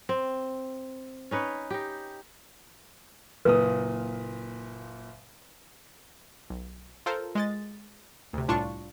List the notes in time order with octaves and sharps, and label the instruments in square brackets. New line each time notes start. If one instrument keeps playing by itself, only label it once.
[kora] C4
C#4 D#4 B4 C#5
D#4 G4
[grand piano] F#1 A#2 D#6 [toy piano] B4
[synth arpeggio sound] B1
F4 A4 A#4 C5
G#3 D#5 A6
D2 C3
C2 A2 D4 F4 A5 C#6